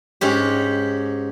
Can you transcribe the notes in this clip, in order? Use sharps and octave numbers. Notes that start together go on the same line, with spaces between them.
G#2 C#4 G4